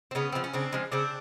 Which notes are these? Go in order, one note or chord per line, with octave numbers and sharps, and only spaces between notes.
C4
C#3 B3 C#4
F3 G#3 C4
C#4
C#3 C4 D4
F3 G#3
C#3 C4 D4